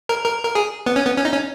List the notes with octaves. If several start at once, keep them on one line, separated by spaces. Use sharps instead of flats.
A#4
A#4
A#4
G#4
B3
C#4
B3
C#4
D#4
C#4